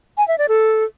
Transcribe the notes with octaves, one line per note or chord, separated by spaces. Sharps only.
G#5
E5
D5
A4